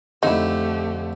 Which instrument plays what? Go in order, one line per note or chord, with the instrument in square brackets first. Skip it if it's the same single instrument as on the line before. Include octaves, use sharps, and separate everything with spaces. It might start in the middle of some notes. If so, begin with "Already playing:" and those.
[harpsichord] F2 D3 [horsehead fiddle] A3 G4 [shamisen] D#4 E4